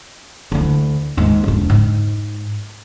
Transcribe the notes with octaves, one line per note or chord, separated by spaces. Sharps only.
D2 E3
D#2 G#2
E1 D4
G#2